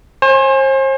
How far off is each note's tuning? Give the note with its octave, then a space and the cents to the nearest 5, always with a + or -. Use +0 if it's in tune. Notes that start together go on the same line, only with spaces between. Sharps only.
C5 +40 G#5 +0